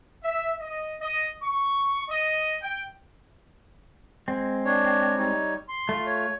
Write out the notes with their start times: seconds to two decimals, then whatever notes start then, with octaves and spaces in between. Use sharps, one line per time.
0.23 E5
0.60 D#5
1.00 D#5
1.42 C#6
2.09 D#5
2.62 G5
4.28 G#3 C4
4.65 D4 C#5
5.16 G3 D#4 C#5
5.69 C6
5.89 A3 F4
6.06 C#5